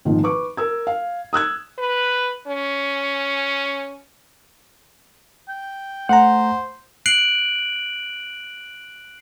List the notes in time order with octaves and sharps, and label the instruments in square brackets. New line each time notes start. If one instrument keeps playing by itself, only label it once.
[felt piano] G#1 A#2 D#3 F3
B4 C#6 D6
A#4 E6 G#6
F5
D#6 E6 F#6 G#6
[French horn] B4
C#4
[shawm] G5
[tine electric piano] A3 A#5 [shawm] C5 [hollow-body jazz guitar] F#5
[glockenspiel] F#6 C7 D7 F#7